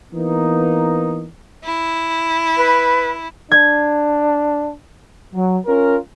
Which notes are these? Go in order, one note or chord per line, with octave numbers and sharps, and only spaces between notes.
E3 A#3 B3 D#4
E4
B4
D4 G#6
F#3
C#4 F4 A#4